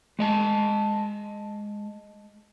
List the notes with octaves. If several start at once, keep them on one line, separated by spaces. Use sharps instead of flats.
G#3 D#5 A5